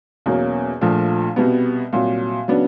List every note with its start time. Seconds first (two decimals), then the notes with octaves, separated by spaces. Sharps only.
0.26 E2 B2 F#3 A#3 C#4
0.81 A#1 A#2 F3 A3
1.36 C2 B2 G3 B3
1.93 C2 A#2 F#3
2.48 C#3 F#3 B3 D4